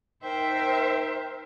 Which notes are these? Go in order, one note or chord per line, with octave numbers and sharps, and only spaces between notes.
D#4 A#4 C5 E5 G5